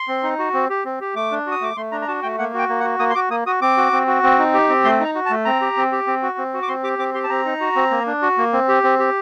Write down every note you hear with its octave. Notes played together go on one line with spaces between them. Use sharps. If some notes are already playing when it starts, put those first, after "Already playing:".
Already playing: C6
C4
D#4
F#4
C4
G4
C4
G4
A3 D6
D4
F#4
D#6
A3 D6
A3 C6
D4 A#5
A#5
F#4 A5
A3 G5
A#3 F#5
F#4 G5
A#3
F#5
F#4
A#3 D#6
C6
F#4 D6
A#3 D#6
F#4 D#6
C4 D6
F#4
C4
F#4
C4
D#4
G4
C4
A3 C6
D#4 A#5
F#4
A5
A3
C4 A#5
G4
C4
G4
C4
F#4
C4
F#4
D6
C4 C6
G4 D6
C4 D6
G4 C6
A5
C4 A#5
D#4
F#4
C4
A#3
D4
F#4
A#3
C4
G4
C4
G4